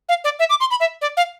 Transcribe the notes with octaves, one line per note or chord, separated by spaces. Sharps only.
F5
D5
E5
D6
C6
B5
E5
D5
F5